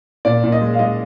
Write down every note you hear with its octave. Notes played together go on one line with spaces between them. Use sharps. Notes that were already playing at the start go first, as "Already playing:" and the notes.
A#2 D5
A#2
D#5
G#3
F5
G#3 D#5